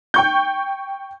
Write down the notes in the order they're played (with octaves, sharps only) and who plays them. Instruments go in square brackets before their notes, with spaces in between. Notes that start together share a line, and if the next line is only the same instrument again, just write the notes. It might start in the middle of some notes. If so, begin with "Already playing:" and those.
[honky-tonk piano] G5 C#6 G6